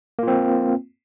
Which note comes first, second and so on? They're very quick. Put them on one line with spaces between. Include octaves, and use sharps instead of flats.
A#3 F4 C4